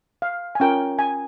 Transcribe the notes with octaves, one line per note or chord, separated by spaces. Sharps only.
F5
G#5
C#4 F4 A#4 G5
G#5